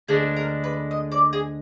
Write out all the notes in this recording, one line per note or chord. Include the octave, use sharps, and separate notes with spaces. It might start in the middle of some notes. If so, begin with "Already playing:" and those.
D2 D3 G#3 D4 G#4
A#4
B4
D#5
D5
G#4